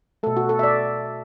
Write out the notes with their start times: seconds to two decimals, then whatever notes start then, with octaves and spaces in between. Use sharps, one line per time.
0.23 B2 A3 A4
0.37 F#4
0.49 A4
0.59 E5
0.63 D5